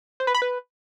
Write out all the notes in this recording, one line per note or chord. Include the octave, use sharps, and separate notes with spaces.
C5
B4
B5
B4